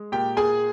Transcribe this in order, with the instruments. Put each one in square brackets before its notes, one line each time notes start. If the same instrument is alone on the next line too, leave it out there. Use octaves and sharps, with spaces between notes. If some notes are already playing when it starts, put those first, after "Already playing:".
Already playing: [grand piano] G#3
A#2 G4 G5
A#2 G#4 G#5